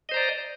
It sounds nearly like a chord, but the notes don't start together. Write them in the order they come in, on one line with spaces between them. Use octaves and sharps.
D#5 C5 A#5 D5